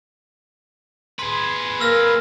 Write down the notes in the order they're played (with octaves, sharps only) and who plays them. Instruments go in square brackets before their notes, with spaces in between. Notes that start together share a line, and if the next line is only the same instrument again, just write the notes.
[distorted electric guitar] G#4 B4 [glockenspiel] C6
[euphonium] A#3 [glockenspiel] E6 F6 A#6